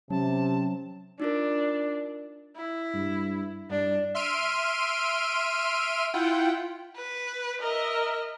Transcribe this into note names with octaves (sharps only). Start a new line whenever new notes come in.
C3 F#3 C#4 A5
D4 D#4 F4 A#4
E4
G2
G2 D4
E5 C6 F6 D7 D#7
E4 F4 F#5 G5
B4
A#4 D#5 E5